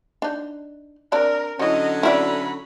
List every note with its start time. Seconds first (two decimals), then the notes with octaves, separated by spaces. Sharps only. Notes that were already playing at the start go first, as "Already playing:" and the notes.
0.22 D4 D#4
1.12 C4 D4 A#4 D5
1.59 D3 F#3 C#4 E4 F#4 D#5
2.03 C4 E4 F#4 D5 E5 B5